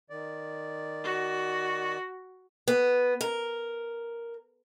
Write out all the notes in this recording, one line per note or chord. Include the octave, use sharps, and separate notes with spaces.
D#3 D5
F#4
B3
A#4